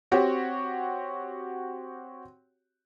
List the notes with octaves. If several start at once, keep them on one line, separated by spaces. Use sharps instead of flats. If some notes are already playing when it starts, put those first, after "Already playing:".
C4 F#4 G4 C#5